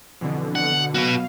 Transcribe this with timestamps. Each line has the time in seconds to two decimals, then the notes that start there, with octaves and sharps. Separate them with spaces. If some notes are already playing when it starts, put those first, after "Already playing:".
0.21 F2 B2 D3 E3
0.55 F#5
0.95 B2 F#3 F#4 B4 F5